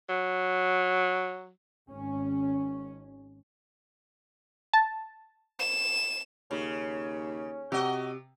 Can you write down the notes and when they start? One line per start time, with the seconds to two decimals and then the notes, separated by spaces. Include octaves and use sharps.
0.09 F#3
1.90 G#1 C#4
4.73 A5
5.60 E7
6.51 D#2 C#3 C#4
7.72 C3 F#4 D#5